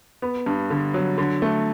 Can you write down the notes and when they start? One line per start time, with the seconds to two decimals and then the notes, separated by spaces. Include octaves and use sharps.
0.22 B3
0.46 G2
0.70 D3
0.94 F#3
1.18 D3
1.42 A3